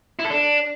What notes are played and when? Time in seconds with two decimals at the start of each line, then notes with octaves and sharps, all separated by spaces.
0.19 E4
0.25 A4
0.30 D4